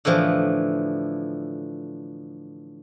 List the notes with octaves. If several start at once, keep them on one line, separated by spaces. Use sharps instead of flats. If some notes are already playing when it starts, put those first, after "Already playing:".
A2 D3 E3 F3